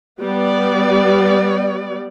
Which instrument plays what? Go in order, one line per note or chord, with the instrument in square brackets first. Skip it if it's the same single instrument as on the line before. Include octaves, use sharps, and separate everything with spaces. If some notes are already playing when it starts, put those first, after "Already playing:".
[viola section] G3 B3 D5